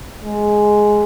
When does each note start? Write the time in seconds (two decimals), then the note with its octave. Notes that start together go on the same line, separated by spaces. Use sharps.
0.25 G#3